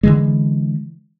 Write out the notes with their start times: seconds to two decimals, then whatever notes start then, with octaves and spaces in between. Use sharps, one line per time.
0.03 D3 E3 G#3